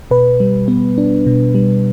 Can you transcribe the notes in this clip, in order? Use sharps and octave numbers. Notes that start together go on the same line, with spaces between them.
B2 B4
G3
B3
D4
B2
G3